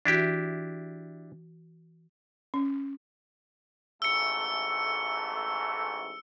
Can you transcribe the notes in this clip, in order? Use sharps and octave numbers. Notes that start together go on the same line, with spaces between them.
E3 D4 E4 F#4 G4
C#4
A1 G#2 A3 E6 C#7